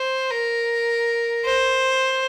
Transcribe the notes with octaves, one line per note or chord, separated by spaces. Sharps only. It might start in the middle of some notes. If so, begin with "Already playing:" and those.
Already playing: C5
A#4
C5